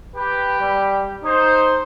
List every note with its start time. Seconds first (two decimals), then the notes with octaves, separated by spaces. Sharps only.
0.16 G4 B4
0.60 G3
1.24 D#4 C5